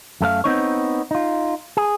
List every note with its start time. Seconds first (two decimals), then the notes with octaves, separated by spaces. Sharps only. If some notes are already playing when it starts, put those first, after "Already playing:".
0.21 F#2 A3 A#4 F5
0.44 B3 C4 D#4 C#5
1.11 D#4 F4
1.77 G#4